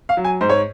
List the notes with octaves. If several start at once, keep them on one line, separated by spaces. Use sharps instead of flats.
F5
F#3
G#5
G#2 C5
C#5